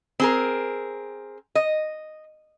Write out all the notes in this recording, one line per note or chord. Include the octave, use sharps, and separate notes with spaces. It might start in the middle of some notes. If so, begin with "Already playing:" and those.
C4 G#4 A#4
D#5